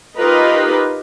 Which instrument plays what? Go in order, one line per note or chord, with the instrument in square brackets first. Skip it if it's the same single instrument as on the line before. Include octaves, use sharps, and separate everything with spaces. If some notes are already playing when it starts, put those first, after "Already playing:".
[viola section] D#4 F4 G4 A#4 B4 D#5